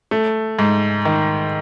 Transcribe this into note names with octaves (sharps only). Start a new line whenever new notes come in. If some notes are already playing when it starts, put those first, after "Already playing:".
A3
G#2
D#3